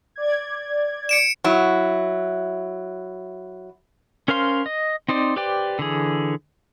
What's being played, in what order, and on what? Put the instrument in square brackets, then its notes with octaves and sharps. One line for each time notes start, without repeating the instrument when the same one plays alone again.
[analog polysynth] D5 G#6
[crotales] C#7 D7 E7
[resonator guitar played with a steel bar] F#3 E4
[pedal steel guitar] C#4 A#4 C5 F5 C6
D#5
C4 D#4 C5 D5
G4 B4 C5 D5 G5
D3 E3 G#4